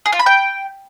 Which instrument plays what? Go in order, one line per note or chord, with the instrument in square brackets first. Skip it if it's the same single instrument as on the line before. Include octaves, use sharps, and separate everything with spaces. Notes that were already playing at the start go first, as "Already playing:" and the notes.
[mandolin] G#4
F4
B5
G5